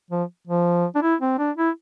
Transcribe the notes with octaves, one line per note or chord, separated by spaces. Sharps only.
F3
F3
D4
E4
C4
D4
E4